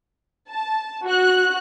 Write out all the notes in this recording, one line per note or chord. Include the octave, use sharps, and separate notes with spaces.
A5
F#4 F#6